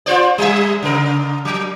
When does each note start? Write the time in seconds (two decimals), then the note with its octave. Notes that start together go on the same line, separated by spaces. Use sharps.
0.06 F4 C5 D5
0.38 G3 E5
0.82 C#3 A#4
1.45 F#3